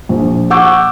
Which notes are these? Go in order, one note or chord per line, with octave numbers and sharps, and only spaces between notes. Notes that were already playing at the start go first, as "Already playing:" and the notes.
A#1
F#5 C#6 D6 E6 G6